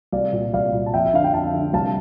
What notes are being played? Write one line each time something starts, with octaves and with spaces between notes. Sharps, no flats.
C2 D5 F5
A#2
C2 D5 F5
A#2
A5
F2 E5 G5
E5
D3 F5
G5
F2 F5 A5
D3
C2 F5 A5